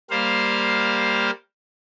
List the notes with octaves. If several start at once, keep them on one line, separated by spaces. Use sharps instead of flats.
G3 A#3 C5 F5